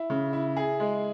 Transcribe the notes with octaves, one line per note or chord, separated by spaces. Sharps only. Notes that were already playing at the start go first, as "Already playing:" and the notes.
Already playing: E4
C#3
E4
G#4
G#3